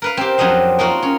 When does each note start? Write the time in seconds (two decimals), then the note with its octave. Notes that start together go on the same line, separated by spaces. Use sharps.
0.02 A#4 B4 F5
0.17 C4 G4
0.38 F2 F#3 D4 D#5 F5
0.79 A#3 D#4 F4 F#4
1.03 C#4